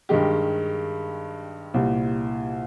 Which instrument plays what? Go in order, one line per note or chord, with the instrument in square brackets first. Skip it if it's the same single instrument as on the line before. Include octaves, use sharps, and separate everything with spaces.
[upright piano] G2 D#3 G#3 G4
C2 A#2 G3